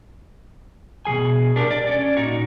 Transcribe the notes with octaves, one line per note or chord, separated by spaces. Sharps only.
B2 D#3 G#4 G#5
D4 G4 A#4
D5
C#4 D5
A#2 D#4 F#4